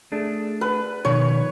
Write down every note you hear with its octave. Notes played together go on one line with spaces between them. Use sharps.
A3 D4 G#4
B4
B2 D#3 F3 C#5